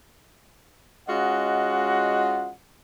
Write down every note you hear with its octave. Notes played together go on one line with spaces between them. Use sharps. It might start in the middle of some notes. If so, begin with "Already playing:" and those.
G#3 C#4 F4 F#4 D#5 F#5